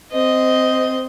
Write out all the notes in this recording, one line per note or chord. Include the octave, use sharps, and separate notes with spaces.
C4 D#5